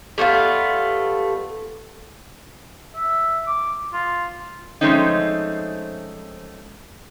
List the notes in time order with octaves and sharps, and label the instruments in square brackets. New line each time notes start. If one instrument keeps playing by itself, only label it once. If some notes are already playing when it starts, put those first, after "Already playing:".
[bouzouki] G3 A3 B3 F4
[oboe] E5
D6
F4
[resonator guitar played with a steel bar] F3 G#3 A3 C4 C#4 D#4